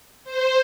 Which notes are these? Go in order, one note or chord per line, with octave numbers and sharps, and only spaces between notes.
C5